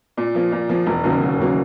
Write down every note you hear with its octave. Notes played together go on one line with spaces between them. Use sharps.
A#2
F3 A#3
A#2
F3 A#3
E1
D#2 C#3 F#3 A#3
E1
D#2 C#3 F#3 A#3